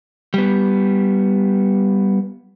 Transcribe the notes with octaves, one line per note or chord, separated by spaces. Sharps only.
G3 B3